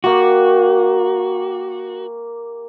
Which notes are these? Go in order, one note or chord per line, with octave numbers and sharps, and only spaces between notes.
A#3 F#4 G4 C#6